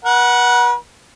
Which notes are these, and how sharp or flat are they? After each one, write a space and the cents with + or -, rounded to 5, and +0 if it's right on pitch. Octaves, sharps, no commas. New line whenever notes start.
B4 -45 F#5 +0